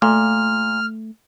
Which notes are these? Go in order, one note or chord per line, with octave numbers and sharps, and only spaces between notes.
A#2 A3 F6